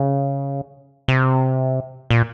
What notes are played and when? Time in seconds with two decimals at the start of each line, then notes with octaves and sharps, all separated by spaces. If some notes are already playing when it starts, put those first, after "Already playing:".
Already playing: C#3
1.08 C3
2.10 A#2